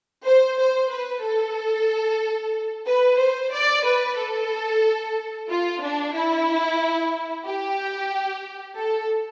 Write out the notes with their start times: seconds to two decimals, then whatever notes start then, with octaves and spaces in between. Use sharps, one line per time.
0.24 C5
0.58 C5
0.90 B4
1.23 A4
2.87 B4
3.19 C5
3.52 D5
3.85 B4
4.17 A4
5.49 F4
5.81 D4
6.14 E4
7.45 G4
8.75 A4